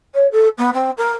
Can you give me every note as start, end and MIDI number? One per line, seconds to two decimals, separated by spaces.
0.15 0.27 73
0.32 0.48 69
0.58 0.71 59
0.74 0.91 60
0.98 1.12 70